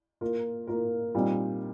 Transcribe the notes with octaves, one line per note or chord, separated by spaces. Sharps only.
A#3 F4 A#4
A#3 F4 A#4
A#2 G3 C4 D#4